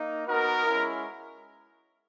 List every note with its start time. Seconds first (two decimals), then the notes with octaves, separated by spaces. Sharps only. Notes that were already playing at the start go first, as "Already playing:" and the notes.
Already playing: A#3 D#4
0.27 B3 D#4 F#4 A#4
0.66 G#3 C#4 E4